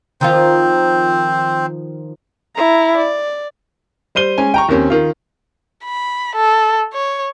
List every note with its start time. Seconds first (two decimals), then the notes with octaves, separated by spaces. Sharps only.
0.21 D#3 F3 C4 F4 C5
2.56 E4 A#5
2.98 D5
4.15 G3 C5 D#7 G7
4.38 G#3 C#4 G#5
4.54 G5 A#5 C#6
4.68 D#2 D#3 C4 C#4
4.90 D#3 F4
5.84 B5
6.36 A4
6.93 C#5